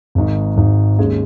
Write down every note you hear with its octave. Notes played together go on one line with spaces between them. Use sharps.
G#1 G#2 D#3
G#1 G#2 D#3
D#2 D#3 G#3 C#4 G#4